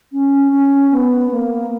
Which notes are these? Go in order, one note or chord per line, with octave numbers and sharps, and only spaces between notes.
C#4
C#4
B3
A#3